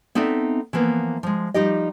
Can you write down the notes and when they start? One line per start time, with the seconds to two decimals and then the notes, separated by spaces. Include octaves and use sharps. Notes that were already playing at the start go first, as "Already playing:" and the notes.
0.15 B3 C4 D#4 A4 D5 E5
0.73 E3 F3 A#3 B3
1.23 F3 G#3
1.54 F3 G3 D#4 G4 D#5